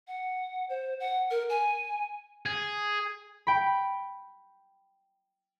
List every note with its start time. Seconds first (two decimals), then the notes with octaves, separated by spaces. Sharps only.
0.08 F#5
0.69 C5
1.00 F#5
1.31 A#4
1.49 G#5
2.46 G#4
3.47 G5 B5